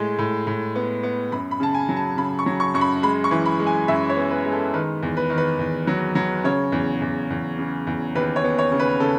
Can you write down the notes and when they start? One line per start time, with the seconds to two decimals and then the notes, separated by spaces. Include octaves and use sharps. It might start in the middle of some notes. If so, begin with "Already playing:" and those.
Already playing: A2 G#3
0.18 A2
0.47 A2
0.76 B3
1.03 B3
1.32 F#2 B5
1.51 B5
1.60 C#3 A5
1.75 G#5
1.89 F#3
1.96 A5
2.17 C#3 B5
2.39 C#6
2.46 F#3
2.60 C#6
2.74 F#2 C#6
2.81 B5
3.03 G#3 B5
3.24 C#6
3.31 E3
3.46 B5
3.59 G#3
3.67 G#5
3.88 F#2 E5
4.10 C#5
4.16 B3
4.30 B4
4.45 G#3
4.52 A4
4.74 D#3 B4
5.03 E2
5.17 B4
5.30 D#3
5.38 B4
5.59 E2
5.87 F#3
6.15 F#3
6.44 C#3 C#5
6.72 E2
7.02 E2
7.30 E2
7.58 C#3
7.87 E2
8.15 D#2 B4
8.36 C#5
8.44 B3
8.58 C#5
8.72 C#3
8.80 B4
9.00 C#3 A4